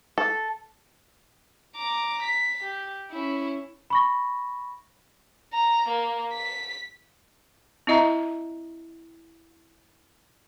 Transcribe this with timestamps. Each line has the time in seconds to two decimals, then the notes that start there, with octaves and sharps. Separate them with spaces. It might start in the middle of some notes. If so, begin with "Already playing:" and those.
0.18 A4
1.76 A#5 D6
2.23 B6
2.62 G4
3.11 C#4 E4
3.90 B5 C#6 A#6
5.53 A#5
5.88 A#3
6.33 B6
7.87 C4 E4 D#5 E5 A#5